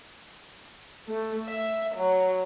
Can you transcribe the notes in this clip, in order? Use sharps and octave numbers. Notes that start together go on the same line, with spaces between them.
A3
E5
F#3